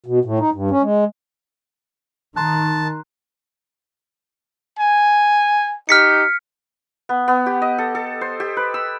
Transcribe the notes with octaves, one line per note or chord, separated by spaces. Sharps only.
B2
A2
D#4
G2
C#4
G#3
D#3 A5 A#5 C6 F#6
G#5
D#4 G4 F6 B6 C#7
B3
B3
G4
D#5
A4
A4
C5
G4
B4
E6